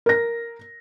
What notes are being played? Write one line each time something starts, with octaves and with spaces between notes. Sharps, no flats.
A#4 A#6